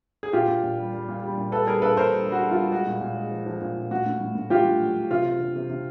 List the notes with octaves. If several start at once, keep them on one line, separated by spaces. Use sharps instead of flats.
G#4
A#2 F4 G4
A#2
A#2
G3
G3
A#2
G3
A#2
G3 A4 B4
G3 G#4 A#4
A#2 A4 B4
A#2 A#4 C5
G3
G3
F#4
G3
F4
G3
G#3 F#4
A#2
A#2
G#3
F3
F3
A#2
A#2
A2 F#4
A2
A2
A2
A2 F4 G4
A2
F#3
F#3
C3 F4
C3
C3
C3
C3